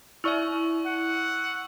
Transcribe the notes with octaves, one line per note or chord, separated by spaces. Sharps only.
E4 D5 E5 C#6 E6
F#5